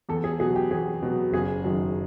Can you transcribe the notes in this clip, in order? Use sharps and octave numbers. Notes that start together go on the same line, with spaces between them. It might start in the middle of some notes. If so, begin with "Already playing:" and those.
E2 A4
G#4
B2 F#3 G#4
G4
E2 G#4
B2 F#3
F#1 G#4
F#2 D#3